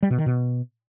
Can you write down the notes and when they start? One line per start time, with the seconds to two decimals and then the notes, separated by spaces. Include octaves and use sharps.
0.03 G3
0.10 B2
0.18 D#3
0.26 B2